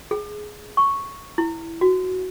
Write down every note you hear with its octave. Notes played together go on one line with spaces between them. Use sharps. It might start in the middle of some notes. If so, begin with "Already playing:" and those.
G#4
C#6
E4
F#4